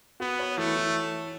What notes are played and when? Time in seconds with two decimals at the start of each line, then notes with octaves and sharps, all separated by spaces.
0.20 B3 F#4
0.39 C#5
0.57 E3 A3
0.76 E3